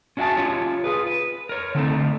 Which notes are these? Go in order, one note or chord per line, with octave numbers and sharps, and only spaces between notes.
C#4 D4 F#4 E5 G#5 A5
C#4 F4 G4 C#5
F4 G#4 B4
B4
A#4 C#5
D3 A3 C4 D#4 G#4 A4